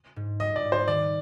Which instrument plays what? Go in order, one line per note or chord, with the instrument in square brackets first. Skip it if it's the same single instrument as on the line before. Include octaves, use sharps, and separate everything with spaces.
[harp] G#2
[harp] G3 [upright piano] D#5
[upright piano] D5
[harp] G#2
[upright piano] C5
[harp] D#3 [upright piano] D5